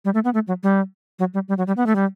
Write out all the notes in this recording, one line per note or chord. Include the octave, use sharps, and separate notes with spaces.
G3
A3
B3
A3
F#3
G3
F#3
G3
G3
F#3
G3
B3
A3
G3